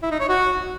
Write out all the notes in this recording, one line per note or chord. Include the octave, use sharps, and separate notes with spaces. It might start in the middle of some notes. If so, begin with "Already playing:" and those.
E4
D#4
C#5
F#4